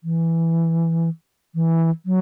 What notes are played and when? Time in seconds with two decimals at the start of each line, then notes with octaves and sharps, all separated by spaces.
0.04 E3
1.55 E3
2.06 F#3